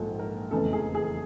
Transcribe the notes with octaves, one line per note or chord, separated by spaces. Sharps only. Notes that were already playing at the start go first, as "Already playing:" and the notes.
Already playing: A#1 G#2 F3 A4
A#4
F1 E2 C#3 E3 A4
G#4
G#4